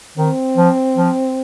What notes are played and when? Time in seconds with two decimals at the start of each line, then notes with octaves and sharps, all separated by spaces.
0.18 D#3 C4
0.57 F3
0.98 F3